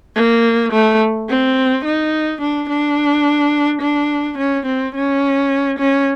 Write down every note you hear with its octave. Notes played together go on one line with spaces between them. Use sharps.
A#3
A3
C4
D#4
D4
D4
D4
C#4
C4
C#4
C#4